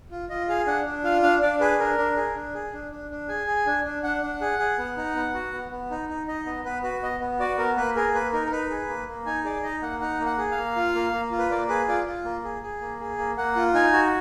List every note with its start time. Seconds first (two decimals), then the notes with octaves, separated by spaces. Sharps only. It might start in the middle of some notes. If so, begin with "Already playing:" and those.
0.11 F4
0.29 F4 D#5
0.49 G#4 F5
0.67 D4 F#5
0.86 D4
1.04 F4 F5
1.23 D4 F5
1.42 D4 D5
1.60 G#4 B4
1.80 D4 A#4
1.98 D4
2.16 G#4
2.35 D4
2.54 G#4
2.73 D4
2.91 D4
3.10 D4
3.29 G#4 G#5
3.47 G#4
3.66 D4
3.85 D4
4.03 D4 F#5
4.22 D4
4.41 G#4
4.59 G#4
4.78 B3
4.97 D#4
5.15 B3
5.34 F#4
5.53 B3
5.71 B3
5.91 D#4
6.09 D#4
6.27 D#4 D#5
6.46 B3 D#5
6.65 B3 B4
6.83 F#4 B4
7.03 B3 D#5
7.20 B3
7.40 F#4 D5
7.58 B3 A#4
7.76 A#3 B4
7.96 G#4 A#4
8.14 A#3 B4
8.33 D#4 A#4
8.47 A#4
8.52 D#4 B4
8.70 G#4
8.89 A#3
9.07 A#3
9.26 D#4 G#5
9.44 G#4 D5
9.63 D#4 D#5
9.82 A#3 F#5
10.00 D#4 F#5
10.20 A#3
10.26 F#5
10.38 G#4
10.51 F5
10.57 A#3
10.76 F4
10.95 A#3
11.13 A#3
11.32 F4
11.38 B4
11.51 A#3 D5
11.69 G#4 B4
11.88 F4 D5
12.06 F4
12.25 A#3
12.44 G#4
12.63 G#4
12.81 A#3
13.00 G#4
13.18 A#3
13.37 A#3 F#5
13.56 F4
13.74 D#4 G#5
13.93 F#4